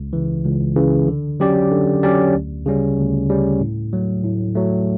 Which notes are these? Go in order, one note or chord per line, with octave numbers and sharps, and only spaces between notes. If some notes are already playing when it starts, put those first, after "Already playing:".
Already playing: C#2
C#3 E3
C#2
C#3 E3
D3
F#3 C#4 G4 D5
D3
F#3 C#4 G4 D5
D2
C#3 G3 C#4
D2
C#3 G3 C#4
A2
F#3 A3
A2
F#3 A3